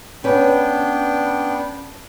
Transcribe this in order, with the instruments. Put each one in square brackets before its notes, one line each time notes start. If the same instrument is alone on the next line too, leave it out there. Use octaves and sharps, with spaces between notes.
[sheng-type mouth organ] B3 D4 G5 [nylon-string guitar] C#4 B4